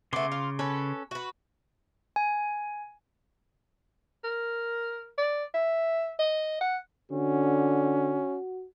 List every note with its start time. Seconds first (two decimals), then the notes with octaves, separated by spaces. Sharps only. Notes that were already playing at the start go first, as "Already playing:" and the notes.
0.13 C#3 A3 B3 C6 D6
0.32 F4
0.59 C#4 A4 B4
1.11 F#4 B4
2.16 G#5
4.24 A#4
5.18 D5
5.54 E5
6.19 D#5
6.61 F#5
7.12 D3 C#4 F#4